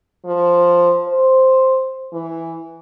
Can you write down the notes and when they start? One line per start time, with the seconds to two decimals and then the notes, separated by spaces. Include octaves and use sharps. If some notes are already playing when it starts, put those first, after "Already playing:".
0.25 F3
1.08 C5
2.13 E3